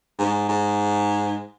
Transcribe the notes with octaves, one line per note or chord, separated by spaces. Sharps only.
G#2
G#2